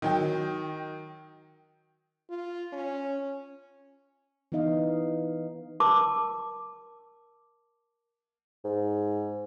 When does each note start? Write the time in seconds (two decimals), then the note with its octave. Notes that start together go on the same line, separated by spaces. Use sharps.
0.02 D#3 F#3 G5
2.30 F4
2.73 C#4
4.52 E3 B3 D#4 D#5 F5
5.80 A#4 A5 D6
8.64 G#2